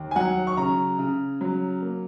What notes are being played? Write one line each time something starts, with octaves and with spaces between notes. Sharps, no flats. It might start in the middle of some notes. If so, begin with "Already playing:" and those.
Already playing: D#2
G#5
F#3 F#5
C#6
C#3 A#5
C#3
F#3
A#3